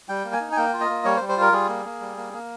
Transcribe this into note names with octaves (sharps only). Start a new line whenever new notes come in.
G3 G5
A#3
G#5
D#4
G#5
A#3 G5
F4
D#5
A#3
G3 C#5
C5
G3
C5
F4 A#4
G3 G#4
A#3
A#3
G3
A#3
A#3